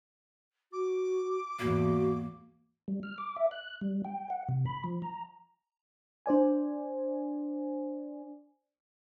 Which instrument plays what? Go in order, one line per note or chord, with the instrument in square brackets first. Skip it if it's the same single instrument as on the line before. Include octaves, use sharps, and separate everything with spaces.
[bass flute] F#4 [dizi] D6
[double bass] E2 G#2 [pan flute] A#3 [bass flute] F#4
[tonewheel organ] G3
F6
D6
E5
F#6
G3
G5
F#5
C3
B5
F3
A#5
[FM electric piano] D4 C5 D5 G#5